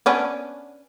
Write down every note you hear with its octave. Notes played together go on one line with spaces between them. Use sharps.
B3 C#4 D4